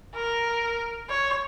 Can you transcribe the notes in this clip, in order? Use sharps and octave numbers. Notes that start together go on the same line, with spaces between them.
A#4
C#5